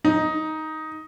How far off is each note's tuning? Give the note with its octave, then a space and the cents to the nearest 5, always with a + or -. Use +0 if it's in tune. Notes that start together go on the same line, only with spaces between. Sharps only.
D#4 +10